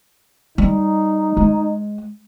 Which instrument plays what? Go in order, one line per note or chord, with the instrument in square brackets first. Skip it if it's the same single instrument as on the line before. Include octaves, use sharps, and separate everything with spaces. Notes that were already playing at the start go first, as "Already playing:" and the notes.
[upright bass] G3 [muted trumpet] D#4
[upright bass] G#3